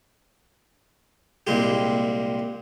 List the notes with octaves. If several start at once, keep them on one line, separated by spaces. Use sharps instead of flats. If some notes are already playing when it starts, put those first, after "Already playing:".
C2 A#2 G#3 G4